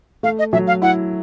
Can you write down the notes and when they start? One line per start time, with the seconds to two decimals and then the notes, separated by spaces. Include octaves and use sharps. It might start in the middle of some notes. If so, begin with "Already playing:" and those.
0.23 A3 F5
0.39 D#5
0.53 F#3 E5
0.67 F5
0.82 E4 F#5